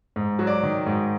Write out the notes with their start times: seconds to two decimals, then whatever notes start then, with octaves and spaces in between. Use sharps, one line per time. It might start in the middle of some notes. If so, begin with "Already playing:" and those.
0.16 G#2
0.39 F#3
0.47 D5
0.63 D#3
0.86 G#2